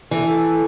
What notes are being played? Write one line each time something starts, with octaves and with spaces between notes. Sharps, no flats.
E3 A4